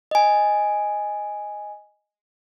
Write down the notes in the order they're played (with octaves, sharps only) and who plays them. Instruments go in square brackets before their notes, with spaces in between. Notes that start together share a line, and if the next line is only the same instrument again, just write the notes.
[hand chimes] D#5 G#5